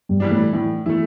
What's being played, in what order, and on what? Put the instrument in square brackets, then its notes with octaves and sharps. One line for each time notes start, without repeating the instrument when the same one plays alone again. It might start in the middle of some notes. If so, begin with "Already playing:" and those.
[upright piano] G2 G3
[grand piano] E3 G3 D4
[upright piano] A2 A3
[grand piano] A2 [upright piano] E3
[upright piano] E3 [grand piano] A3 E4